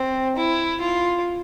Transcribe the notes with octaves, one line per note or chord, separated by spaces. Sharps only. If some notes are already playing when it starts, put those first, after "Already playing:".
Already playing: C4
E4
F4